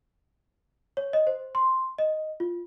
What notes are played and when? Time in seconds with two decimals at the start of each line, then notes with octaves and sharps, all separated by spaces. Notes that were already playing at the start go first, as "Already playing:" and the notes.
0.97 C#5
1.13 D#5
1.27 C5
1.55 C6
1.99 D#5
2.40 F4